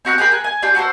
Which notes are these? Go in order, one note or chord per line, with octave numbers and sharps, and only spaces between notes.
C4 F#4 A#5 F#6
G4 G#4 A#4 B5
A#4 G#5 F#6
G#5
D4 F4 G4
F#4 A4 A#4 C5